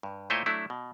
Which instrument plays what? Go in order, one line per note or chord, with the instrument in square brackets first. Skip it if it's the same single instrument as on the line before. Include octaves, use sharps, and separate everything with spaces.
[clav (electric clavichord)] G2
A#2 A3 E4 C5 C#5 D#5
F#3 A3 D4 E4
B2